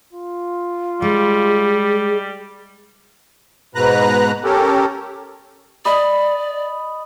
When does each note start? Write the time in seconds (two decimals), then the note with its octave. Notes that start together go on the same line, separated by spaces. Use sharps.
0.13 F4
1.02 G3 G#3 G#4
3.75 G#2 B2 B4 A#5 F#6
4.44 C#4 G4 A4 A#4
5.85 D5 D#5 B5 D#6